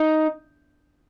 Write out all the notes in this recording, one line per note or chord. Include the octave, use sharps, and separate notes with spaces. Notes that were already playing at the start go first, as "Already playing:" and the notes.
Already playing: D#4